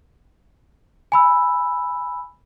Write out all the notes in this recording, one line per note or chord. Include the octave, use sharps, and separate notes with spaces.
G#5 B5 E6